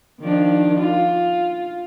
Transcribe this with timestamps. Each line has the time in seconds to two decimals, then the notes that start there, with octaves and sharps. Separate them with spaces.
0.20 D#3 F3 D4
0.80 F4